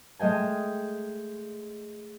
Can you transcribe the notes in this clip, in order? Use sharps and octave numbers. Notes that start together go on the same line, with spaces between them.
G#3 A3 D#5 G5 G#5